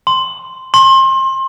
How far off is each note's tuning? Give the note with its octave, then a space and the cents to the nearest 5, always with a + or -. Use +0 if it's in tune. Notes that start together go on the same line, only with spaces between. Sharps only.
C6 -5
C6 +30